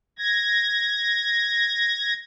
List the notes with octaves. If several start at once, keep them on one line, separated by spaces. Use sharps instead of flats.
G#6 A#6